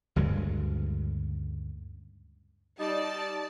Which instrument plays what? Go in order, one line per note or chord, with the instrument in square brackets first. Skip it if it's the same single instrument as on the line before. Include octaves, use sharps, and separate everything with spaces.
[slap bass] D2 G2 C#3 G#3
[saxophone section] G3 D#4 [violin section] D5 A5